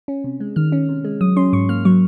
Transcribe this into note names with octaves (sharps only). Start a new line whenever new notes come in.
C#4
C3
G#3
D#3 F6
C#4
C3
G#3
F#3 D#6
C#4 C6
G#2 C#6
A#3 F6
F#3 C#6